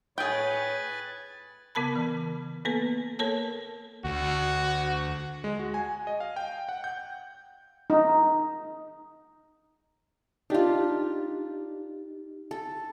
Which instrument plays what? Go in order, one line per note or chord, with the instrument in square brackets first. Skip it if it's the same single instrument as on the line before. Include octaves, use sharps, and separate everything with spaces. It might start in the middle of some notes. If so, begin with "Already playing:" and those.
[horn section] A2 C#5 [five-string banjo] G#4 G5 [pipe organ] B4 G#5 A6
[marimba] C#3 B3 A#4 A5 B5
E3
A#3 B3 A4 B4
A#3 A4 A#4 C#5 A5
[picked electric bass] D2 [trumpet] F#4
[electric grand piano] G#3
F#4
G#5
D#5
F5
G5
F#5
G6
[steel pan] D#4
[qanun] D4 F4 [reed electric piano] D#4 G4
[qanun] A4